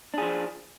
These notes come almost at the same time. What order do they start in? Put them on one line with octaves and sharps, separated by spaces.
D4 G#4 F3